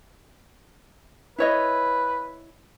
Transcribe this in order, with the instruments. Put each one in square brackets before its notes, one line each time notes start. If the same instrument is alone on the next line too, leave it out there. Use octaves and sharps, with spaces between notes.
[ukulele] E4 C#5 D#5 [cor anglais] B4